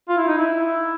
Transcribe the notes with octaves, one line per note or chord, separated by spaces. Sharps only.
F4
E4
D#4
E4